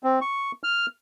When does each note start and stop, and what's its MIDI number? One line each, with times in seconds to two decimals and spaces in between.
0.03 0.19 60
0.21 0.52 85
0.64 0.86 89